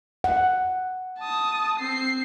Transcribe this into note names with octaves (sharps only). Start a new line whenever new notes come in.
F#5
A5 D#6
C4 C7